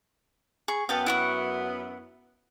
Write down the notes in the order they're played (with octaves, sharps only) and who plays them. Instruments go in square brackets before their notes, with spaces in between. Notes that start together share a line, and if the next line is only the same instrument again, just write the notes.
[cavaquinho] G#4 C#6
[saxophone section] F#2 B3 [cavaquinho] F5 G5 A5
[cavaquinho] E4 F#5 C#6